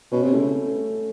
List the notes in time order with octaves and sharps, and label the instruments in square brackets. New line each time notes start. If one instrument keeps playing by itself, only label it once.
[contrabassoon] B2 [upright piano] C#4
[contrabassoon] C3
[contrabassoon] C#3 [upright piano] A3